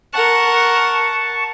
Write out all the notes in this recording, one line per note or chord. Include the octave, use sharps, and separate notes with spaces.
A#4 F#5 A5 C#6